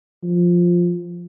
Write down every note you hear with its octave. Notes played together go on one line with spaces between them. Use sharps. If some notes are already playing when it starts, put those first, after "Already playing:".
F3